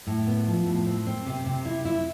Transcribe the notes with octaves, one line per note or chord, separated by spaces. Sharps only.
A2
B3
F3
A2
C4
C4
C3
C3
E4
E4